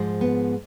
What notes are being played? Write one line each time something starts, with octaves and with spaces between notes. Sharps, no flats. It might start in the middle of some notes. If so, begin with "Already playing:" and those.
Already playing: G#2 F3 G#3
B3